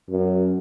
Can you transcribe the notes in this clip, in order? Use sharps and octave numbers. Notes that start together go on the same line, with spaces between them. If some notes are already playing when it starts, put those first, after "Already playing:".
F#2